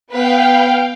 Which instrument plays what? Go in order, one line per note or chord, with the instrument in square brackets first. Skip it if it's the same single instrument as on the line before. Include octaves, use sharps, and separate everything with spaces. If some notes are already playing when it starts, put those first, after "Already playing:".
[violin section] B3 B4 [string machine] F5 G5